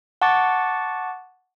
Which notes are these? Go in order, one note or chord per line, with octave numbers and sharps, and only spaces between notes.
F#5 A5 C#6 D6 A6